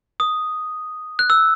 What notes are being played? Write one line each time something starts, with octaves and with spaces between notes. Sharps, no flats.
D#6
F#6
E6